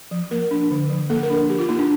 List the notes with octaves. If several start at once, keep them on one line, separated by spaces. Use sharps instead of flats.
F3
A#3 A#4
D4
D3
F3
A#3 A4
A#4
D4
F3 G4
F4
A#3 D#4
D4